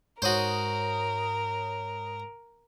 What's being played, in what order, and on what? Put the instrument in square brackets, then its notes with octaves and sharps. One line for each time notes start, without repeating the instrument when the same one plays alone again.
[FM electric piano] G#2 C#5 D#6 [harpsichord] F#4 C5 [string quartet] A#4